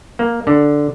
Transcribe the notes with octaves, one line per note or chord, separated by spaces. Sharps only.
A#3
D3